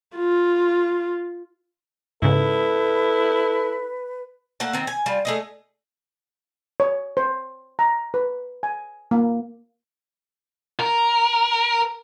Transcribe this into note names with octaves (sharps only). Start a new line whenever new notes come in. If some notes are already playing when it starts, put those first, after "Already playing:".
F4
G#2 C#3 E4 A4 B4
A3 A#3 F#5 A5
D#3 C4
G#5
G3 F4
A3 G#4 D#5
C#5
C5
A#5
B4
G#5
A#3
A#4